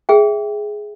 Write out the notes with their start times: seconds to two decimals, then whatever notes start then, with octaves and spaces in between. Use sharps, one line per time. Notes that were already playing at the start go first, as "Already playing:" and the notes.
0.09 G#4 E5 G5